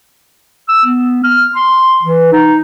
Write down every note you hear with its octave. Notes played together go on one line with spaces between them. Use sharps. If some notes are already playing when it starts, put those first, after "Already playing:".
E6
B3
F6
C6
E3
D#4